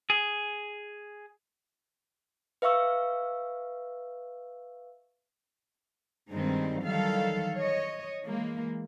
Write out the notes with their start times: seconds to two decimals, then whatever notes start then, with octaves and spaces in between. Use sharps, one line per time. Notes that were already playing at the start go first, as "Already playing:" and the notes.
0.10 G#4
2.62 B4 E5 F5 C#6 E6
6.30 G2 D#3 G3 G#3 C4 D#4
6.81 D#3 E3 F#3 G3 A4 F5
7.55 C#5 D#5
8.24 E3 G#3 A#3